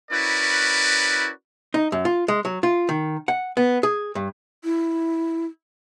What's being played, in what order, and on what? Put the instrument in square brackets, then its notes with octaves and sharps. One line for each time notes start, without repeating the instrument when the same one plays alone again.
[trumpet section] C#4 E4 F#4 A#4 B4 D5
[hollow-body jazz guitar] D#4
F#2
F4
G#3
F#3
F4
D#3
F#5
B3
G#4
G2
[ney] E4